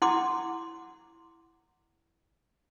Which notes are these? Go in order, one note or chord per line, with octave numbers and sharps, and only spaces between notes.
E4 F#5 C6 D6